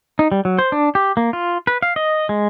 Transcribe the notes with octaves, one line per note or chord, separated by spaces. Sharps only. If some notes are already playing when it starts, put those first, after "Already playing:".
D#4
G3
F#3
C5
D4
G4
A#3
F4
B4
F5
D#5
G#3